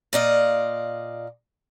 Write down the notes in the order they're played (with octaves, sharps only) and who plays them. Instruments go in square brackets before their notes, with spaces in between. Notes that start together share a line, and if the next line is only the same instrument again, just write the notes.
[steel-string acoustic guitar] A#2 D5 D#5 F5